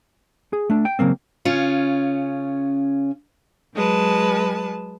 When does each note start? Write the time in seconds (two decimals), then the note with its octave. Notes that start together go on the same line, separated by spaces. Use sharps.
0.53 G#4
0.70 A3 D4
0.85 G5
0.99 C#3 F#3 A#3 C4
1.45 C#3 C#4 F4
3.74 F#3 G#3 B4 A5